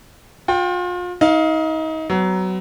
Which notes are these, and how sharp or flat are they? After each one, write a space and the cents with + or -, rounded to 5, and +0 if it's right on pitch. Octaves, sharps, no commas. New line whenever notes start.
F4 +35 G5 +0
D#4 +30 F5 +0
F#3 +20 B3 +30